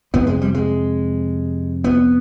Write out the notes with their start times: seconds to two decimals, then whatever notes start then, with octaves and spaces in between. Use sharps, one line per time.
0.14 F2 C3 B3
0.27 G#3
0.41 G3
0.54 G#3
1.84 B3